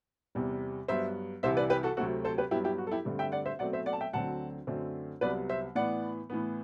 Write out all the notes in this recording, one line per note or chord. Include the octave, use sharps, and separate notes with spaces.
E2 C3 G3
G2 F#3 B3 C5 E5
C2 C3 E3 C5 E5
B4 D5
G4 B4
F#4 A4
D2 C3 F#3 A3 C4 F#4 A4
A4 C5
G4 B4
G2 F#3 B3 E4 G4
E4 G4
F#4
A4
E4 G4
G2 D3 A3 C4
E5 G5
D5 F#5
C5 E5
B2 F#3 A3 C4 D5 F#5
C5 E5
D5 F#5
A5
E5 G5
D2 D3 F#3 C4 F#5 A5
F#2 D3 A3 C4
C2 C3 F#3 B3 B4 D5
C5 E5
A2 E3 B3 D5 F#5
A2 E3 B3